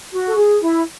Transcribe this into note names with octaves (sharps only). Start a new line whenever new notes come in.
F#4
A4
G#4
E4